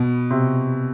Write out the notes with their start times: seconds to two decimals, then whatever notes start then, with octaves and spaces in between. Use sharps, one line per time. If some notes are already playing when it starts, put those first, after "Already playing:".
Already playing: B2
0.30 C3